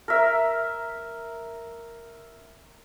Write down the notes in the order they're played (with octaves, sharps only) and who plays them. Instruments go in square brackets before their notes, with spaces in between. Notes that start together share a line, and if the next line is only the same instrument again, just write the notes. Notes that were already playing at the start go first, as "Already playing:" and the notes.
[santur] A#4 E5